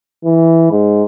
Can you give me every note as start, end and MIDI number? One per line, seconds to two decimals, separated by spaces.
0.25 0.71 52
0.71 1.03 44